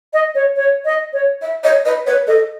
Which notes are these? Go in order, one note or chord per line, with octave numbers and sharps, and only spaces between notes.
D#5
C#5
C#5
D#5
C#5
E5
C#5 D#5
B4 D#5
B4 C#5
A4 D#5